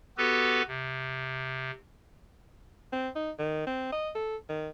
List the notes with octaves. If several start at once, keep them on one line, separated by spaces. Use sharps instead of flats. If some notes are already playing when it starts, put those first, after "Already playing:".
B3 F#4 G4 A4 B4
C3
C4
D#4
D#3
C4
D#5
A4
D#3